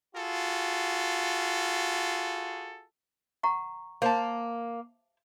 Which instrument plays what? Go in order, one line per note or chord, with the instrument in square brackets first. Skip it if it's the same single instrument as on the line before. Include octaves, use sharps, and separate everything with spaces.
[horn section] F4 F#4 G#4 A4
[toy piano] F#5 A#5 C#6
[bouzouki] A#3 [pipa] C5 E5 A5